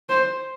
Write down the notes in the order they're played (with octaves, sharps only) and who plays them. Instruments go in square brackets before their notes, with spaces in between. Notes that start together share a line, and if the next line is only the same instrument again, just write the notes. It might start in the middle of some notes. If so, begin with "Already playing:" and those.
[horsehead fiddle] C5